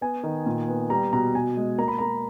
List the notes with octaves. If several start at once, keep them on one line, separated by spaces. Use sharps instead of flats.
B3 G#5
D#3
A#2
B3
G3 A#5
B2 A#5
B2 G#5
G#3
A#3 A#5
B5
A#3 A#5